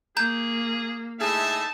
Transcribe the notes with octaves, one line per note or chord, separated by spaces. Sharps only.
A#3 G#4 A#5 G6
A2 D#4 G#4 E5 A5